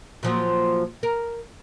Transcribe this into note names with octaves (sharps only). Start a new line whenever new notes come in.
A#2 F3 F#3
A#4